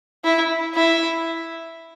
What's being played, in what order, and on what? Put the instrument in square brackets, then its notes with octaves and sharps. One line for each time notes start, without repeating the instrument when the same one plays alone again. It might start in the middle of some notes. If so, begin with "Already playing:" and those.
[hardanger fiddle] E4
E4